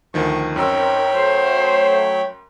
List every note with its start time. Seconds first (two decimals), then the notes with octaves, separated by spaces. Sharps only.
0.14 D2 D#3 F3 C#6
0.56 F#2 C4 D#4 A#4 C#5 G5 B5 E6
1.12 F#3 A3 C5